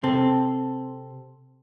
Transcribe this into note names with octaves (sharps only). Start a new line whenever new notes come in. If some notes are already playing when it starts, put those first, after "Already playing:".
C3 C4 A4